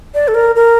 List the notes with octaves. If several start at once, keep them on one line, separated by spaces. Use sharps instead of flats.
D5
A4
A#4
A#4